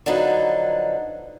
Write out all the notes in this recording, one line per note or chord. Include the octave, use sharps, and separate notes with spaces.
D3 F3 F#3 D#4 B4